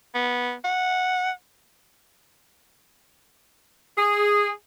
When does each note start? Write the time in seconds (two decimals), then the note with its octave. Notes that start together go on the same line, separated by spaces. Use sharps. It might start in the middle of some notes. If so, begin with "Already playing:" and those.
0.15 B3
0.64 F#5
3.98 G#4